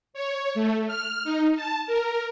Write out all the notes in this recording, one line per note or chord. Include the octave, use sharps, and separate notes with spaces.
C#5
A3
F6
D#4
A5
A#4